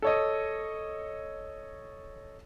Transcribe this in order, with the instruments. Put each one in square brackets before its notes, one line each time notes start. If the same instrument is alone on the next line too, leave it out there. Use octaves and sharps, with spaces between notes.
[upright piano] A4 C#5 D#5